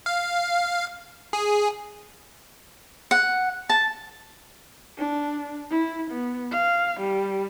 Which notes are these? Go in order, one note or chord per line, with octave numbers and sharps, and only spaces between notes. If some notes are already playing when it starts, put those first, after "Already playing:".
F5
G#4
F#5
A5
D4
E4
B3
F5
G3